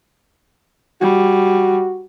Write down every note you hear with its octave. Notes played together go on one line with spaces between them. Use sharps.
G3 F#4